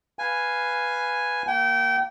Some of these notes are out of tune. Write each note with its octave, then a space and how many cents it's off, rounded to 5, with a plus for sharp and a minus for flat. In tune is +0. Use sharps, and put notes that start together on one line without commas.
B4 +0 F5 +0 G#5 +0
A#3 +0 G5 -30